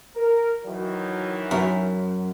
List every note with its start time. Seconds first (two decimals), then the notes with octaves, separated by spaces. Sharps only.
0.16 A#4
0.65 D#3 E3 F#3
1.51 F#2